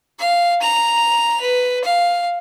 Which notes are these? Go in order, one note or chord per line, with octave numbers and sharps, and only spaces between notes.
F5
A#5 F7
B4
F5